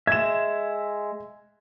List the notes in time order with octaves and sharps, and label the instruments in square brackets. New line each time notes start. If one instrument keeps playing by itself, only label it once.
[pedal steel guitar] G#3 E5 [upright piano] G#6 E7